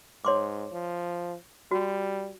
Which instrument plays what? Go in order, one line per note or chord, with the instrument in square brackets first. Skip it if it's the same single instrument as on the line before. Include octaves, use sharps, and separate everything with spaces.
[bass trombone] G#2 [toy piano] C#5 C6 D6
[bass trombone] F3
[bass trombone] G3 [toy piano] F#4